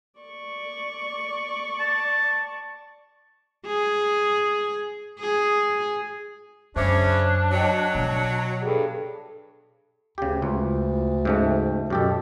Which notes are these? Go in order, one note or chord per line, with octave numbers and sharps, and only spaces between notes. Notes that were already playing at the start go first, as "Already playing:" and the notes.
D5 C#6
A5
G#4
G#4
F#2 C#3 C#4 D4 C5 E5 D6
F#3 C#5 D#5 G5
B2
G2 G#4 A4
D2 C#3 G4
C#2
G#2 C#3 A3
F#2 B2 G4 A4